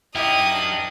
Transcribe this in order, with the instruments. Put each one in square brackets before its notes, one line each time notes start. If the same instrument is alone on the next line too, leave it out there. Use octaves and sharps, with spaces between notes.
[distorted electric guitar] F#2 A#4 [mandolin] D#4 G4 G5 [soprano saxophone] E4 [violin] D#6
[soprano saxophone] D4